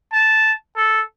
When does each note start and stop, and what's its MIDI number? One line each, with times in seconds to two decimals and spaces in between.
0.13 0.52 81
0.76 1.02 69